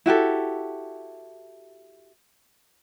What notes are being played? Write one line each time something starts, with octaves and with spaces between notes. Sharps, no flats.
E4 F#4 G4 A4